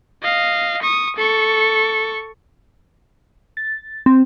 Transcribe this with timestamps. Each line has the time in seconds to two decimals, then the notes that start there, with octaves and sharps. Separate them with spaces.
0.22 D#5 F5
0.82 C#6 D#6
1.16 A4 C#6
3.57 A6
4.06 C4